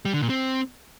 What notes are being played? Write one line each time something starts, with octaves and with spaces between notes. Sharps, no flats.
G3
D3
A#2
C4